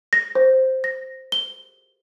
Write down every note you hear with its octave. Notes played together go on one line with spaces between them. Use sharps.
A#6
C5
A#6
G7